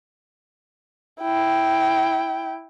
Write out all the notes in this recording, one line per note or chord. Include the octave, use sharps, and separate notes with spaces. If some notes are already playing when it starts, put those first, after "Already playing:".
E4 G5